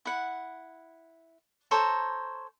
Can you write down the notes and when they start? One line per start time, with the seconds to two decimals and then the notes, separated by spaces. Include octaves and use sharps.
0.05 E4 F#5
1.71 A4 C5 C#5 A#5